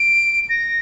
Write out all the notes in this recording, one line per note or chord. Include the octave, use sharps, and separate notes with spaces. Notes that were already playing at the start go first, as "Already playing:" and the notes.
Already playing: D7
A#6